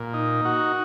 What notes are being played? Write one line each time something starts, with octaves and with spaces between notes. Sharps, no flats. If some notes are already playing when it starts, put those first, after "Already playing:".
Already playing: A#2
D#4
F#4